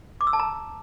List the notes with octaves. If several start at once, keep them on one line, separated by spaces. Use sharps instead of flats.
D6
E6
A5
A#5